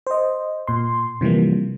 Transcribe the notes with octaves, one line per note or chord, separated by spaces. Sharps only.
C5 D#5
A#2 C6
C3 E3 F3 G3 A#3